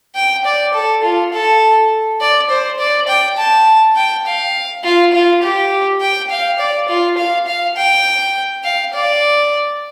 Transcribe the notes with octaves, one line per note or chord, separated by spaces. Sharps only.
G5
D5
A4
F4
A4
D5
C5
D5
G5
A5
G5
F5
F4
F4
G4
G5
F5
D5
F4
F5
F5
G5
F5
D5